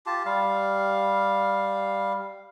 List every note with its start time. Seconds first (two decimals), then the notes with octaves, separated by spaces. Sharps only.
0.06 F4 G4 A5
0.26 G3 F5